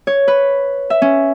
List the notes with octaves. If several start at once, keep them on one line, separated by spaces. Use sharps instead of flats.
C#5
B4
E5
C#4